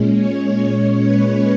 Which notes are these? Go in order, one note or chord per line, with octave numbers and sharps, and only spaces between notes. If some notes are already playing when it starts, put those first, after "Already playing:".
Already playing: A#2 G#3 C#4
C#5
C#5
B4